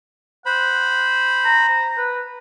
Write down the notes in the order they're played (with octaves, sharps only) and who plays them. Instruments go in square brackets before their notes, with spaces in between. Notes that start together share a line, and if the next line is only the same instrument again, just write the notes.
[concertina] C5 B5 [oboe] F#5
[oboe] A#5
B4